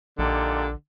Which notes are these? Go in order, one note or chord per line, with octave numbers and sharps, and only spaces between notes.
A#1 A#2 D3 D#4 G4